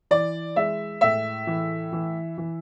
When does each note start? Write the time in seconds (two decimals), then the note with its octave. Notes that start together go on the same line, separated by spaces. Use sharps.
0.11 E3 D5
0.56 G#3 E5
1.01 A2 E5
1.47 E3
1.92 E3
2.38 E3